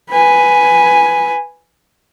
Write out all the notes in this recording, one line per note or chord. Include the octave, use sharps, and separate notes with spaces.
B4 G#5